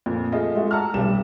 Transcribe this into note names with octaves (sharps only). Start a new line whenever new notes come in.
F2 A#2
A3 F4 G#4 D#5
G#3 A3 F#4
F#5 A5 A#5 E6 F6
F1 B1 G3 E7